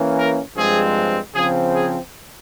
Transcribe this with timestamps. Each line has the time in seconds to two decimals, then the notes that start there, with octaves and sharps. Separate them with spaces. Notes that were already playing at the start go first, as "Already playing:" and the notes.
Already playing: E3 A#3 C#4
0.17 A#4
0.56 G2 F3 G#3 C4 G#4
1.34 C#3 F3 C4 G#4
1.74 G#4